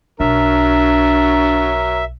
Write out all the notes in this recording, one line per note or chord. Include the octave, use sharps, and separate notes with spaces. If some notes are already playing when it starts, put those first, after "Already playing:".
B1 F#3 D4 A#4 E5